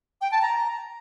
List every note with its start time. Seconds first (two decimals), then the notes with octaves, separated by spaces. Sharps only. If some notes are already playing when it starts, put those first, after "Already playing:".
0.21 G5
0.32 A5
0.42 A#5